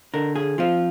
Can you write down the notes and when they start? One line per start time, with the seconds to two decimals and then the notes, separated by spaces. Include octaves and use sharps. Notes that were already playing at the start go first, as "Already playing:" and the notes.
0.14 D3 A#4
0.36 G#4
0.58 F3 C4 F4